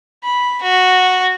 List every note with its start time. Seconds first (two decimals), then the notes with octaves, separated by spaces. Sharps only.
0.24 B5
0.62 F#4